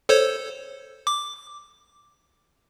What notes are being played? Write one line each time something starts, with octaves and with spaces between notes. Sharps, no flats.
A4 C5 C#5
D6